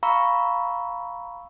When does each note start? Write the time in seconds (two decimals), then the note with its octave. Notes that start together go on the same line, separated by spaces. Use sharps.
0.03 F5 A#5 B5 C#6 E6